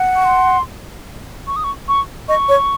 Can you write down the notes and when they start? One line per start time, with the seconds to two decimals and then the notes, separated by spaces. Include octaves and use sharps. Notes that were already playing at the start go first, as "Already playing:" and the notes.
Already playing: F#5
0.16 C#6
0.25 C6
1.47 C#6
1.56 D#6
1.64 C#6
1.88 C#6
2.28 D#5 C#6
2.49 C#5